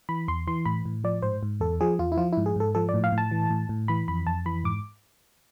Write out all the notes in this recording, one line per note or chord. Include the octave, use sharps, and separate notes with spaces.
E3 B5
E2 C6
E3 C6
A2 B5
A2
F3 D5
G#2 C5
G#2
E2 A4
F3 G#4
E2 F4
E4
F3 F4
G#2 E4
G#4
G#2 A4
F3 A4
D5
A2
F5
A2
A5
E3
A2
A2
E3 B5
F2 B5
F2 A5
E3 B5
G#2 D6